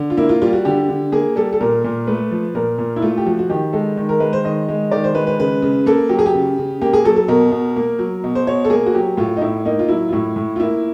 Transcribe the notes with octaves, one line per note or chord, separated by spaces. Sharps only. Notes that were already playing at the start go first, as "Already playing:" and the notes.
Already playing: D3
F4
A#3 E4
F4
G3 F4
F#4
D3 G4
D3
A#3 G#4
G3 A4
A4
A#2 A#4
A#2
A3 B4
F3
A#2 A#4
A#2
E4
A3 F4
G4
F3 F#4
F#4
D#3 G4
G#3 A4
D#3
A#4
G#3 B4
C5
D#3 D#5
G#3
D#3 D5
C5
G#3 B4
B4
C#3 B4
C#3
A#3 A4
F#3 G4
G#4
G4
C#3
C#3
A#3 G4
G#4
F#3 A4
A4
B2 A#4
B2
A#3
F#3
B2
C5
B2 C#5
A4
A#3 G#4
F#4
F#3 G4
A2 F4
D#4
A2 E4
A#3 D#4
F4
F#3 E4
F4
A2 E4
A2
F4
A#3 E4